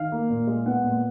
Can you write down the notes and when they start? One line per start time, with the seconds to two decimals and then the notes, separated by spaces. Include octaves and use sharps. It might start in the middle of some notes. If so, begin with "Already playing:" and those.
Already playing: D#3 F5
0.12 A#3
0.30 A#2
0.47 G#3
0.66 B3 F#5
0.84 A#2